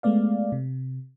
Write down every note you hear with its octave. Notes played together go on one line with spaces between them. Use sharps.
G#3 A3 B3 D5 F5
C3